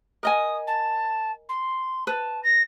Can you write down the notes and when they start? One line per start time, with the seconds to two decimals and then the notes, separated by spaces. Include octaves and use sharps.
0.23 A#4 D#5 G#5 D#6
0.67 A5
1.49 C6
2.07 B4 A5
2.43 A#6